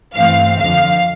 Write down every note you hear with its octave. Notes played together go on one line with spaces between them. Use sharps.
G2 E3 A3 C4 F5
F2 D3 F3 F5